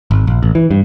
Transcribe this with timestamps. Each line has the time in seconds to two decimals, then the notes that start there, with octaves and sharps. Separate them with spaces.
0.11 G#1
0.27 A#1
0.43 A1
0.55 E3
0.71 G2